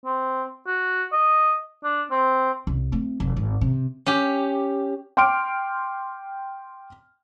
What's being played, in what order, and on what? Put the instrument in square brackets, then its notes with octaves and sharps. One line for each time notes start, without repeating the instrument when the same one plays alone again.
[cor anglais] C4
F#4
D#5
D4
C4
[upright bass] C2
A3 C4
F1
G#1
C3
[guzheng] C#4 G4
[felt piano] G5 C6 D6 F6 D7